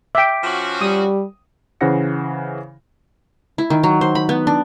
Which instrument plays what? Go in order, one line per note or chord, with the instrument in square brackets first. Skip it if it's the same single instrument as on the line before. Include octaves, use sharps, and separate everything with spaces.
[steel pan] E5 G5 [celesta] D6 B6 D7
[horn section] F3 C#4 F#4
[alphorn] G3 [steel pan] D#6
[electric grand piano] C#3 E3 C5 F#5 A#6 C#7
[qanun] E4
D#3
F#3
C5
B5
B3
D4